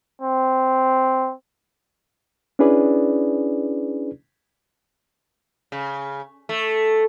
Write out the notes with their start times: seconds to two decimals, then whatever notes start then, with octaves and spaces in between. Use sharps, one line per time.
0.22 C4
2.59 C#4 D4 E4 G#4 B4 D5
5.72 C#3
6.49 A3